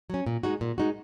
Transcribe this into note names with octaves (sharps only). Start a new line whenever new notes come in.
F#3 C#4
A#2
G#3 D#4 F#4
A#2
G#3 D#4 F#4